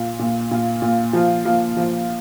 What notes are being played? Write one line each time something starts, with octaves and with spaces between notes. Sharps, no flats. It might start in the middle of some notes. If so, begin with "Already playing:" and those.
Already playing: A#2 A#3 F4
A#2 A#3 F4
A#2 A#3 F4
A#2 A#3 F4
F3 A#3 F4
F3 A#3 F4
F3 A#3 F4